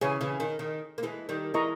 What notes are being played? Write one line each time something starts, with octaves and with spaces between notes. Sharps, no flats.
C#3 E3 G#4 C#5 G#5
C#3 E3
D#3
D#3
A#3
E3 G#3
D#3 G3
E3 G#3 E4 A#4 D#5 A#5 C#6